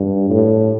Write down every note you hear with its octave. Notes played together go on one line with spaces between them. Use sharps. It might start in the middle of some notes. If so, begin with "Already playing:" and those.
Already playing: G2
A2